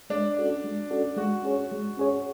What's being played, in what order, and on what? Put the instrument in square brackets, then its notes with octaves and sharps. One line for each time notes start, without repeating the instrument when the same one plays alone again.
[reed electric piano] G#3 [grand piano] D4
[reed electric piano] C#4 F#4 A4 D5
G#3
C#4 F#4 A4 D5
[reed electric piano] G#3 [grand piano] F#4
[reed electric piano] C#4 G#4 C#5
G#3
C#4 G#4 C#5